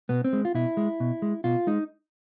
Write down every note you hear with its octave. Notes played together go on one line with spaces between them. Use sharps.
B2 B3
C4
G#3
F4
B2 E4
G#3
B2
G#3
B2 F4
G#3 D#4